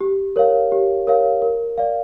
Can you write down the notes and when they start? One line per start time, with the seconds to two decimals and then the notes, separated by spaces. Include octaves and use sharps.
0.01 G4
0.36 A#4 C#5 F5
0.72 G4
1.07 A#4 C#5 F5
1.42 A#4
1.78 D5 F5